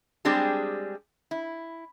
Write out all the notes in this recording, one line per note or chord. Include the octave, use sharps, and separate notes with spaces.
G3 G#3 C4 D4 G4 G#4
E4